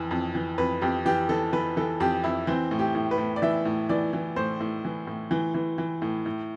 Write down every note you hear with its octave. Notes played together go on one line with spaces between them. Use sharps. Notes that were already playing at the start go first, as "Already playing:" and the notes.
Already playing: F2 E3
F2
E3
F2 B4
F2 G4
E3 G4
E3 A4
E3 B4
E3 A4
F2 G4
F2 E4
E3 C4
A2
G4
A2
B4
A2
D5
E3 E5
A2
E3 D5
E3
A2 C5
A2
E3
A2
E3
E3
E3
A2
A2